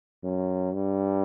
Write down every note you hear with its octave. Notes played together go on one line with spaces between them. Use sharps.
F#2
G2